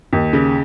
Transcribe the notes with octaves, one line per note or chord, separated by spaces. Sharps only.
D#2
C#3